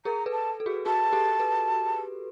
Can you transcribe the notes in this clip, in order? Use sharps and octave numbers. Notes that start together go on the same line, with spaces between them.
G#4 A#4 A#5
A4 B4
A5
A4
F#4 G#4
F#4 G#4 A5
G4 A4
A4 B4